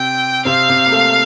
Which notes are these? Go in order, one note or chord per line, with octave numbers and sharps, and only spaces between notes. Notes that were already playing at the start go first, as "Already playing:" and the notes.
Already playing: C3 C4 G5
C3 C4 F5
C3 C4
A#3
A3